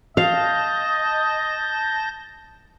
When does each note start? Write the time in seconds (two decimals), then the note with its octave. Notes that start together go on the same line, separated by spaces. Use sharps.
0.17 D#5 F5 A5 G6 A#6